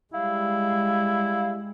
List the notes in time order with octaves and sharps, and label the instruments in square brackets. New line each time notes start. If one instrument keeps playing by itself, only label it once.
[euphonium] G3 [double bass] G#3 [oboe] E4 [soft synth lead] F5